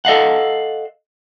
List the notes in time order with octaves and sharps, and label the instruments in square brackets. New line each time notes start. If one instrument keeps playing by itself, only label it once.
[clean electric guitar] A4 D#5 F5 F#5